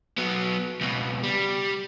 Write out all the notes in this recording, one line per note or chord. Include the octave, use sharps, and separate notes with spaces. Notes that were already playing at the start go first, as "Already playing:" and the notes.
F#3 B3
C#2 B2
G3